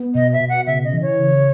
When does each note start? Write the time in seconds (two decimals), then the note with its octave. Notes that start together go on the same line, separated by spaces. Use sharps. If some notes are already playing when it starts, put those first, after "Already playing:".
Already playing: B3
0.15 B2 D#5
0.33 E5
0.40 B2
0.49 F#5
0.66 C#3 E5
0.84 D#5
0.93 E3
1.02 C#5
1.19 C#3